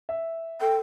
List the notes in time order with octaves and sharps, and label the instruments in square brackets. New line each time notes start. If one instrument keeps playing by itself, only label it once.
[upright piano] E5
[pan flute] A4 [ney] G5